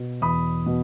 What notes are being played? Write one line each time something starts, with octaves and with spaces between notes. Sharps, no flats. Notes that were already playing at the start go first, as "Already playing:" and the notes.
Already playing: B2
E2 B5 D#6
B2